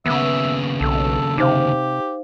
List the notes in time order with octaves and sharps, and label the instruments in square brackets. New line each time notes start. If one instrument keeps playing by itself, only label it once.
[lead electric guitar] D#2 C#3 [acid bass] B3 [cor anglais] E5
[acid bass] B1 [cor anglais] A4
[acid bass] C3 [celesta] D#4 C5 F5 [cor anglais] G4